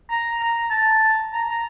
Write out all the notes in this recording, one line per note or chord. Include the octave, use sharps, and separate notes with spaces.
A#5
A#5
A5
A#5
A#5